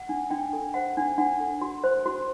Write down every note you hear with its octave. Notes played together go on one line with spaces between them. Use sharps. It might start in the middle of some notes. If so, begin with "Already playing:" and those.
Already playing: F#5
D4
D4 G5
A4
C5 F#5
D4
D4 F#5
A4
F#4
C5
F#4